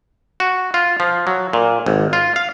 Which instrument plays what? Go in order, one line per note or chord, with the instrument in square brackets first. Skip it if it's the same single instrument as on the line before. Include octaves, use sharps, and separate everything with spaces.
[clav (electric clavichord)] F#4
F4
F3
F#3
A#2
G#1
F4
F5